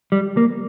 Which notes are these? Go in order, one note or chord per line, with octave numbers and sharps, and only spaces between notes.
G3
A#3